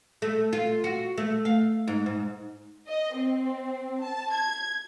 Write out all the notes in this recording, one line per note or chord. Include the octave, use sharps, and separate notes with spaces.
A3
F4
F#4
A3
F5
G#2
G#2
D#5
C4
A5
G#6